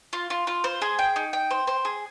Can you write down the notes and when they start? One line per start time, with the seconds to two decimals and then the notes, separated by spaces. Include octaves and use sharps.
0.13 F4
0.30 F4
0.47 F4
0.64 C5
0.82 G#4
0.99 G5
1.16 D#4
1.33 G5
1.51 C5
1.67 C5
1.85 G#4